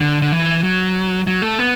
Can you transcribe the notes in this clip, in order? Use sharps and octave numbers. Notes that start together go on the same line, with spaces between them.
D3
D3
E3
F#3
F#3
A3
B3